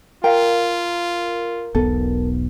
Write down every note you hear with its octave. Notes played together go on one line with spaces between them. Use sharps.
F4 A#4 F5 G5
E1 B1 B3 A4